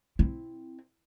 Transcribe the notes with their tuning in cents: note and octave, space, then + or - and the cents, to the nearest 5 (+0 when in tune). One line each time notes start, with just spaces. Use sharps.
C4 +0 E4 +0